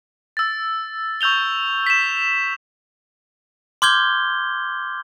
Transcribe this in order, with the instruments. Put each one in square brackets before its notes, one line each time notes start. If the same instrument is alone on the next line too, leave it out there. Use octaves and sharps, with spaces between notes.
[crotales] E6 A6
C#6 E6 G6 F7 G7
B6 E7
[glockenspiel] C6 D6 F6 G6 G#6 G7